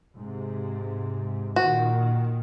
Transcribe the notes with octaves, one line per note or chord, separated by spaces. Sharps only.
G#2 C3
A#2 D#3 F#4